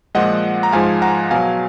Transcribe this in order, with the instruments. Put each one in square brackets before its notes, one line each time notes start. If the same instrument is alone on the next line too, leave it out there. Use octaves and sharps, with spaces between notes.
[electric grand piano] A#2 F3 G#3 D#5 F#5
A#5
G#2 F3 G#3 F5 G#5
F#5 A#5
B2 F#3 F5 G#5